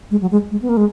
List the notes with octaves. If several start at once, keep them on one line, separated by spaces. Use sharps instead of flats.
G#3
F#3
G#3
G#3
B3
A#3
G#3